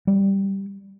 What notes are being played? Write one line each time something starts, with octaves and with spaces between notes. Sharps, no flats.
G3